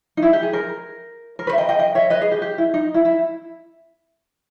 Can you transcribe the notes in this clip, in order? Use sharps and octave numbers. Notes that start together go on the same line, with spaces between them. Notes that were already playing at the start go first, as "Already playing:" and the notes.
D#4
E4
G4
G#4
A#4
A#4
B4
E5
D#5 G5
D#5 G5
D#5 G5
C#5 E5
B4 D#5
G#4
G4
G4
E4
D#4
E4
E4